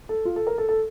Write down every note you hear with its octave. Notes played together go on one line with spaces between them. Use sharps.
A4
F4
A4
A#4
A4
A4